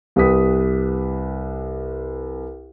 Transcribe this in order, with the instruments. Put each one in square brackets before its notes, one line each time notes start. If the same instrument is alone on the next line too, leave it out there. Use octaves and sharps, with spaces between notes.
[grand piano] C2 G4 B4 D#6 B6